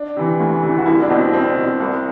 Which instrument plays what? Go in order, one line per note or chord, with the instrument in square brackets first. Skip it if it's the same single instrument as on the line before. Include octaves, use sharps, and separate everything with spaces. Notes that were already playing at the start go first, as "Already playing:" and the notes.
Already playing: [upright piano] D4
C3 E3
D2
C3 E3
F#4
C2 E4
D4
B2 C4
C2 C4
B2
C2